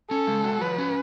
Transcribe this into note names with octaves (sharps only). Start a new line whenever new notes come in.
C#4 A4
G#3
F#4
F3 B4
C#4